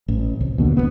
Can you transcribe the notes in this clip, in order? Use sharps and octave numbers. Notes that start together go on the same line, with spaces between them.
A1
C2
D#2 B2 D3
D#1 F#2 B3